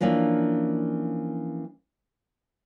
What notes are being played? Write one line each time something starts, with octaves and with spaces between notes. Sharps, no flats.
E3 F3 A#3 C#4 D4